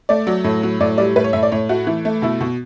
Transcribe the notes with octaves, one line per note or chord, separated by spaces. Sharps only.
A3 D5
F#3
A2
F#3
A2 D5
G3 D5
A2 B4
C#5
A2 E5
D5
A2 C#5
A3 F#4
E3
A3
B2 E4
B2